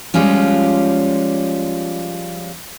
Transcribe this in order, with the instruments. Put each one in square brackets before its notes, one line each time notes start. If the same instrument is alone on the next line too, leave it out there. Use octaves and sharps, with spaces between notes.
[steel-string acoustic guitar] F3 G3 G#3 C#4 F4